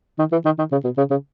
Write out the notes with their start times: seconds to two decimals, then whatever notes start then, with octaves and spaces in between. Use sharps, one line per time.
0.19 D#3
0.32 E3
0.45 D#3
0.58 D#3
0.72 C#3
0.84 B2
0.97 C#3
1.11 C#3